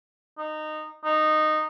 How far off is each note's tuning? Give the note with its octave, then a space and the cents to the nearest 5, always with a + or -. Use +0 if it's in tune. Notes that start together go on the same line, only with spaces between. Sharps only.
D#4 -15
D#4 -15